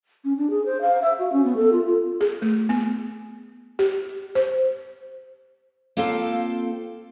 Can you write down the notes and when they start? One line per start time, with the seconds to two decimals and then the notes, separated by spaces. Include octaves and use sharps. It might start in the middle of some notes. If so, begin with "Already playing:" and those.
0.24 C#4
0.38 D4
0.50 G#4
0.66 C5
0.81 F5
1.02 E5
1.19 F#4
1.32 C#4
1.45 B3
1.56 A4
1.72 F4
1.86 F4
2.21 G#4
2.42 A3
2.69 B3
3.79 G4
4.35 C5
5.97 A#3 C4 F4 A4 F5 G5